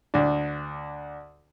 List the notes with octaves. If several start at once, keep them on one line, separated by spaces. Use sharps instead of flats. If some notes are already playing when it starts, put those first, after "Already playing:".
D2 D4